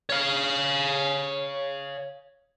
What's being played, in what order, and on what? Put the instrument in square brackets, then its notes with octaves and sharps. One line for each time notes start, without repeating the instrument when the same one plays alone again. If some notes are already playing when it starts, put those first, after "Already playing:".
[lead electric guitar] C#5 F5